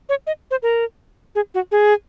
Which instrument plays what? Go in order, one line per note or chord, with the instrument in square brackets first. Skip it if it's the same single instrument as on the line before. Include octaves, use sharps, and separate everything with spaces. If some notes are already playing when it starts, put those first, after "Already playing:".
[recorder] C#5
D#5
C5
A#4
G#4
F#4
G#4